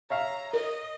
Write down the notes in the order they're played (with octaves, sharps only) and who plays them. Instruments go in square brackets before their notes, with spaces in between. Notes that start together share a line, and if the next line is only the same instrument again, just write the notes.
[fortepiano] C#5 E5 F5 [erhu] A#5
[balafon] A#4 [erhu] D#5